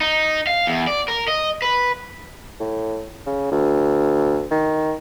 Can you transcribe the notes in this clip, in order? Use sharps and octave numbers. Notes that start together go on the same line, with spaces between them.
D#4
F5
E2
D5
A#4
D#5
B4
A2
C#3
D2
D#3